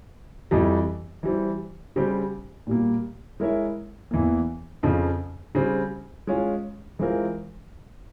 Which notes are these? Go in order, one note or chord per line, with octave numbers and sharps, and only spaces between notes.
F2 E3 G3
E3 G3 C4
C#3 G3 C4 G4 C5
A#2 G3 A#3
G#3 E4 A#4 C#5 E5
E2 E3 A#3
F2 C#3 F3
C#3 G3 C4
G#3 C#4 F4
E3 G#3 C4 F4 A#4